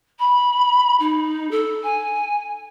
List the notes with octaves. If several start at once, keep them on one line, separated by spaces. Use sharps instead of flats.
B5
D#4
A4
G#5